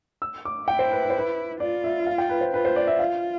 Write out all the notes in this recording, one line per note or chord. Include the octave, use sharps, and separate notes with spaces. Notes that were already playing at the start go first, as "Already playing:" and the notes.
E6
D6
E4 G5
C5
B4
B4
C5
B4
F4 D5
E5
F5
G5
B4
C5
F4 B4
C5
D5
E5
F4 F5